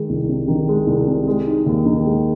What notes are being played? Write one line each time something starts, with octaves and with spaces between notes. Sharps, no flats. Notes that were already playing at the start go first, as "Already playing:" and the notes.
Already playing: D#3 G#3
C2
C3
D#3
G#3
C2
C3
G#3
D#4
D#2
D#3
G#3